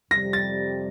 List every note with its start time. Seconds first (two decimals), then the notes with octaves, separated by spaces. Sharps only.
0.11 F2 C3 G3 A#6
0.33 A6